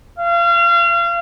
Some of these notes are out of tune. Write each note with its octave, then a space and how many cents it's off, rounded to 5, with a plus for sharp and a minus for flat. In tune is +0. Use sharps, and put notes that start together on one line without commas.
F5 -30